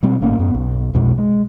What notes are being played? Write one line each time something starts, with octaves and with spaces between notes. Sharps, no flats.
B2 G3 C4
G#1 A2 A#3 C#4
F#2 B3
B1
B1 F2 B2 G#3
G#3